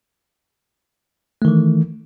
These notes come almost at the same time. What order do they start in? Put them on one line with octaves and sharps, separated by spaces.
A3 D#3 E3